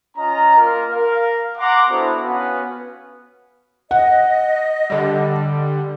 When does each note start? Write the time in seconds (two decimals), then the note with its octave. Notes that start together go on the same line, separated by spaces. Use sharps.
0.17 C#4 F4 D#5 A#5
0.57 A#3 F4 A#4
0.90 A#4 F5
1.58 F#5 A#5 C6 D6
1.90 B3 D4 E4 F#4 A4 C5
2.24 B3 C#4 F#4 B4 F5 F#5
3.91 D#5 F#5
4.90 D3 G3